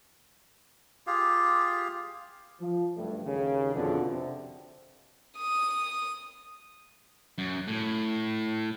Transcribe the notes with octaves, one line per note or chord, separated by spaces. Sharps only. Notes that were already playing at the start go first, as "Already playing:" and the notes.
F4 G4 G#4 F5
F3
F#1 G2 A3
D#2 C#3
F2 B2 D3
C3
D#6
F#2
A2